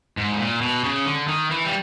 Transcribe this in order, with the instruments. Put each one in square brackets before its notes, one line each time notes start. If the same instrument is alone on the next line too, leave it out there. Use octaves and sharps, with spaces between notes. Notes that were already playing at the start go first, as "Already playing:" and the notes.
[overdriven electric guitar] G#2
A2
A#2
B2
C#3
D3
D#3
E3
G3